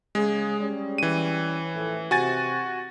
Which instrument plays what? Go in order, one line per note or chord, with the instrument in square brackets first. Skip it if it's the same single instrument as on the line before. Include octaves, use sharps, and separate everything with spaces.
[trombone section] C#3 G#4 [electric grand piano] G#3
[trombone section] G3 C#4
[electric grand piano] E3 D#7
[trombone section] A2 F3 A3
[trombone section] C3 [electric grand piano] F#4 G#5 A6